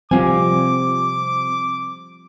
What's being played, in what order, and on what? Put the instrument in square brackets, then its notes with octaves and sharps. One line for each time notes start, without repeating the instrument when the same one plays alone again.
[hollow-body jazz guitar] C3 F4 G#5 [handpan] F3 G3 C4 [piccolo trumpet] D6